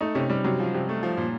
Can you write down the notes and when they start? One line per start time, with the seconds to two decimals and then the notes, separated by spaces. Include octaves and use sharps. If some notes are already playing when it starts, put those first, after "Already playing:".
0.01 A3 D#4
0.15 C3 C#4
0.29 C3 G3
0.44 C3 F#3
0.60 F3
0.74 C3
0.89 A3
1.03 F3
1.17 A#2